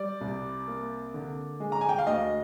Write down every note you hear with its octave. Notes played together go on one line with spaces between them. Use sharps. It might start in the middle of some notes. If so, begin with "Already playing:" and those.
Already playing: G3 D5
C2
A#3
D3
G#3
A#5
G#5
G5
F5
D2 D#5